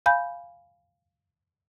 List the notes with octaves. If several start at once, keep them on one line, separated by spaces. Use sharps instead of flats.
F5 G#5 B5 G6